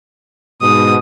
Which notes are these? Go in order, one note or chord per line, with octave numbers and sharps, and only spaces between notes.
G#2 B2 D#6